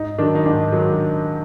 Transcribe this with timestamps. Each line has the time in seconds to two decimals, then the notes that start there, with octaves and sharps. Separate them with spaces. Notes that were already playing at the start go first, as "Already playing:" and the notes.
Already playing: G#2 D#4
0.18 D#3 F#3 D4
0.35 D#4
0.46 G#2 D4
0.72 D#3 F#3